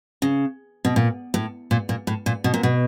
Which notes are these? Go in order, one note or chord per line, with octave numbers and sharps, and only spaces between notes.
C#3
B2
A#2
A2
A#2
A#2
A2
A#2
B2
A#2
B2